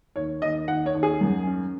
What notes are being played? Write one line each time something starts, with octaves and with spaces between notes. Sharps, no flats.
D#2 C#5
D#2 D#5
D#2 F#5
C#5
D#2
G#4
F#2
C#4